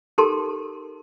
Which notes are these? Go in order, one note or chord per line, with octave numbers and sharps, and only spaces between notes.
D#4 G4 A4 A#4 A5 C6